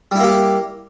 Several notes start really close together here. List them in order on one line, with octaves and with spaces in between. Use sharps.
G3 E4 A#3 G4